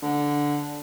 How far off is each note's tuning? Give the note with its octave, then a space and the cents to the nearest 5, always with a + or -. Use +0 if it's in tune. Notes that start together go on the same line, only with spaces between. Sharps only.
D3 -5